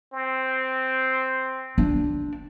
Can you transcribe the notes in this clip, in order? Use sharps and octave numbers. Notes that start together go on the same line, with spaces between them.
C4
D4